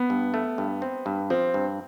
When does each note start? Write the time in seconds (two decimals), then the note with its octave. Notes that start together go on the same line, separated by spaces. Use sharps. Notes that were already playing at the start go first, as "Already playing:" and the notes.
Already playing: B3
0.10 G2
0.34 A3
0.58 G2
0.82 C4
1.06 G2
1.30 F3 C4
1.54 G2